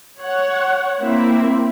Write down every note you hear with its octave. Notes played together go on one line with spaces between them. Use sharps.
C#5 F#5
A#3 C4 E4 E5